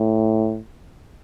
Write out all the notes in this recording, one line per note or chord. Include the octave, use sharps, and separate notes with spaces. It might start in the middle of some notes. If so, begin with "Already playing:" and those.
Already playing: A2